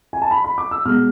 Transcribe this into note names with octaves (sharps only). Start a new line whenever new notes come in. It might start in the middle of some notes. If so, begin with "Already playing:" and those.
G#5
A5
B5
B5
D6
E6
B2 G#3 F6